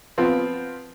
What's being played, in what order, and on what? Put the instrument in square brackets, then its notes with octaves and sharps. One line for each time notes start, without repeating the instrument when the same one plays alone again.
[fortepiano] F3 B3 C4 F4